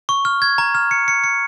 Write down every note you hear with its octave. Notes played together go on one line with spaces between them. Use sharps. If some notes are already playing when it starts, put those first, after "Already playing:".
C#6
F6
G#6
A#5
F6
C#7
C#7
C#7